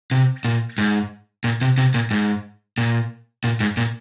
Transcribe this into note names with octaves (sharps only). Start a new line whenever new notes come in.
C3
A#2
G#2
A#2
C3
C3
A#2
G#2
A#2
A#2
G#2
A#2